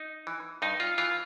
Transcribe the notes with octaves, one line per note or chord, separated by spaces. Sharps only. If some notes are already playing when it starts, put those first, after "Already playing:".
Already playing: D#4
E3
G2 D#4
F4
E3 F4